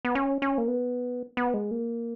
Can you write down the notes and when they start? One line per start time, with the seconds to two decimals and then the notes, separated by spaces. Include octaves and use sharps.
0.05 B3
0.15 C#4
0.42 C#4
0.58 A#3
0.68 B3
1.37 B3
1.54 G#3
1.71 A#3